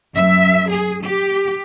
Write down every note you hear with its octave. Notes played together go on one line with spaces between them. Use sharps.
F#2 E5
G#4
G4